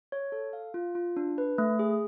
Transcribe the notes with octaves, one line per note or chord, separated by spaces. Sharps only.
C#5
A4
F5
F4
F4
D4
B4
A3
G#4